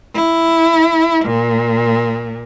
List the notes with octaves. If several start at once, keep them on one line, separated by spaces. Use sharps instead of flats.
E4
A#2